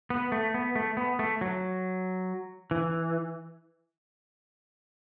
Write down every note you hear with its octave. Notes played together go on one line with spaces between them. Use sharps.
B3
A3
B3
A3
B3
A3
F#3
E3